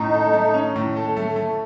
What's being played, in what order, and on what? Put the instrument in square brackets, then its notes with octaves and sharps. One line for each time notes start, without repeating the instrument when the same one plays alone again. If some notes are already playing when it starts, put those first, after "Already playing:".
Already playing: [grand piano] A2 C#4 [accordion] D#4
[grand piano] A4
A3
C#4
A2
A4
A3
A3